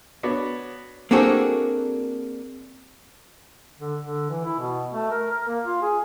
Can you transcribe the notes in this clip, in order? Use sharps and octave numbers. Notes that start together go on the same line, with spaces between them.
B3 D4 F#4 C#5
A#3 C4 D4 F#4 G#4 A4
D3
D3
E3
E4
B2
A3
A#4
A#4
A#3
F4
G#4